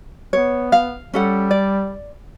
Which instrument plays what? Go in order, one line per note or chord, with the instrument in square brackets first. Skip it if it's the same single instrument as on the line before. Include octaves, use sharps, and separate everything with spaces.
[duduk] B3 [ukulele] C#5
[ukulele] F5
[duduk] G3 [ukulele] C#4 A4 F#5
[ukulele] D5